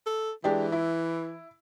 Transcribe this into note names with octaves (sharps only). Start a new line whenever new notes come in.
A4
E3 G#3 D4 G4
E4